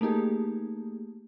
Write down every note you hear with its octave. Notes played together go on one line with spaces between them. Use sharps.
A3 A#3 D#4 G4 G#4